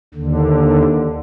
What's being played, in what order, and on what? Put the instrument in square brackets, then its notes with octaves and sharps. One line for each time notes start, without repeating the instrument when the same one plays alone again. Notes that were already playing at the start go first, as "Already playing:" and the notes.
[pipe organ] D#2 D3